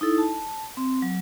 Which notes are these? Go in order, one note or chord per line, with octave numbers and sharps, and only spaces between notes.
D#4 E4 A4
A5
C4
F#3